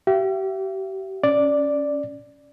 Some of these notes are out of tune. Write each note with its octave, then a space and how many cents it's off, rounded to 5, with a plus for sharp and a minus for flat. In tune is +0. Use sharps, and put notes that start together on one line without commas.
G4 -35 E5 +40
C#4 +0 D5 +0